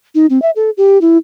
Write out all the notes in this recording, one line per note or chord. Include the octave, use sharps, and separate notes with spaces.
D#4
C4
E5
A4
G4
E4